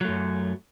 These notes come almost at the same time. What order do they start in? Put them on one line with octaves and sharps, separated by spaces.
F#3 A3 F#2